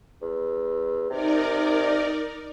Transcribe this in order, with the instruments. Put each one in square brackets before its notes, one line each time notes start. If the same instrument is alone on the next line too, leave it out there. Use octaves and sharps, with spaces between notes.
[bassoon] E2
[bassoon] C3 [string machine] D#4 A#4 D5